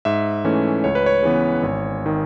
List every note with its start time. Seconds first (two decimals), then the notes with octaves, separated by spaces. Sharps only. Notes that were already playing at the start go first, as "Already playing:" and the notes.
0.05 G#2 E5
0.45 E3 A3 C#4
0.84 C#2 C#5
0.95 B4
1.06 C#5
1.22 C#3 E3 B3
1.63 G#1
2.06 D#3